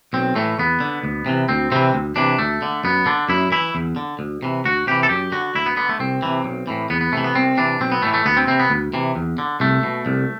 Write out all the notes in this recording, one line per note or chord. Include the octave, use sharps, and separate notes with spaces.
B1 C4
A2 E3 A3
E2 B3
D3
D2
C3 E3
D2 C4
C3 E3 C4
D2
C3 E3 D4
D2 A3
D3
F#2 B3
D3 D4
F#2 E4
E3 E4
E2
D3
D2
C3 E3
D2 F#4
C3 E3 G4
A4
F#2 G4
D3 F#4
D2 E4
B3
D3 B3
A3
C2 C4
C3 E3
B1
A2 E3
E2 B3
B3
C3 E3 A3
B3
C2 C4
C3 E3 D4
B1 C4
B3
A2 E3 A3
A3
D2 B3
C4
C3 E3 C4
B3
D2
C3 E3
E2
D3
C2 A3
B2
C2